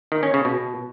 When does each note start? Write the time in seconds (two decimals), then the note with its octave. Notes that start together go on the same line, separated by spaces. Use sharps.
0.12 D#3
0.23 C#4
0.34 C#3
0.45 B2